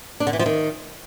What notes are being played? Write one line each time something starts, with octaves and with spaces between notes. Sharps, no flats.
D4
D3
E3
F3
D#3